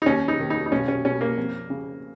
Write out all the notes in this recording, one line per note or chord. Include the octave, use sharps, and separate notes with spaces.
D#4
D#2 C#4
D#4
D#3
D#4
D#4
B1 C#4
C#4
B2 C#4
A#3
F2
C#3